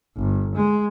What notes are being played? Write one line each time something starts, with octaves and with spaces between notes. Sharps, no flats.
G1
G#3